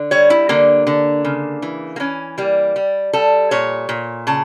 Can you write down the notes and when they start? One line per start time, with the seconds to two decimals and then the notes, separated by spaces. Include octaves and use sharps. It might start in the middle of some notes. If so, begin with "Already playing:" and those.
Already playing: D3
0.11 G3 C#5
0.30 E4
0.49 D3 A#3
0.87 D3
1.25 C#3
1.62 E3
1.96 A#3
2.00 E3 C#4
2.38 G3 A#3
2.76 G3
3.13 G3 A4
3.51 A#2 C#5
3.89 A#2
4.27 C#3 A5